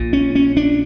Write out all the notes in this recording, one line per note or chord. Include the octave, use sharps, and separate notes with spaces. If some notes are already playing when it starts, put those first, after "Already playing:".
Already playing: A#1 A#2
C#4
C#4
D4